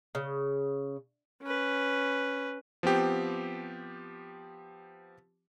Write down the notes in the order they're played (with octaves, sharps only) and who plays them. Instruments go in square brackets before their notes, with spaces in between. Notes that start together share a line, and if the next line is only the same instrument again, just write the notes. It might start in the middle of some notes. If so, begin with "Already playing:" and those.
[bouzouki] C#3
[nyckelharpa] C#4 B4
[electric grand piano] F3 B3 C4 G4